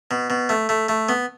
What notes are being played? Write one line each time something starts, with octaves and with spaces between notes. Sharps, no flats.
B2
B2
A3
A3
A3
B3